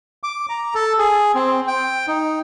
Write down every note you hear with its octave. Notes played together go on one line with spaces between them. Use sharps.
D6
A#5
A4
G#4
C4
G5
D#4